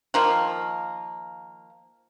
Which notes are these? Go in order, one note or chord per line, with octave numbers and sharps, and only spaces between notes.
D#3 F3 A#3